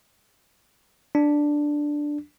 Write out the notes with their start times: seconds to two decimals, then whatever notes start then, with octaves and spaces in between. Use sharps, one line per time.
1.15 D4